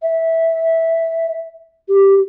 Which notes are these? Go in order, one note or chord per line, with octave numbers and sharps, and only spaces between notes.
E5
G4